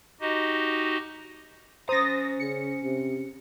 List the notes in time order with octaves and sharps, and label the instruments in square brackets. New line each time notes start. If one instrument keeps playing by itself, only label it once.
[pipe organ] D#4 F#4 G4 D#5
[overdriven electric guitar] C#4 A#5 [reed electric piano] C5 [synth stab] D#6 A6 A#6
[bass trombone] C#3 [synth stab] C#7
[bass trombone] C3